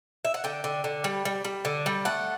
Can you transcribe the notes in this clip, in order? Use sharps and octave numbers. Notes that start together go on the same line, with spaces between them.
E5
F#5
D3 G5
D3
D3
G3
G3
G3
D3
G3
A3 F#5